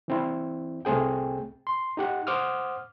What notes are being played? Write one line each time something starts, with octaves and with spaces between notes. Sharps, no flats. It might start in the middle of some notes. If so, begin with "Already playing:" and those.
E3 C4 E4
C2 A3 C4 G#4 G5
C6
D#4 G4 F#5
C5 F#5 D6 D#6 F6